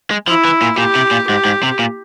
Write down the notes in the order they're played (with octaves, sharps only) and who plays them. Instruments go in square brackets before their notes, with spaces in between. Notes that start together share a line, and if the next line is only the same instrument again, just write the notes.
[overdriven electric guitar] G#3
[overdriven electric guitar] F3 [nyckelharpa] E4
[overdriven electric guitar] E3
A#2
[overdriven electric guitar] A#2 [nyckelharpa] G4
[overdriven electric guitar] C3
A#2
[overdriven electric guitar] G#2 [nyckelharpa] G4
[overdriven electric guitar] G#2
C3
A#2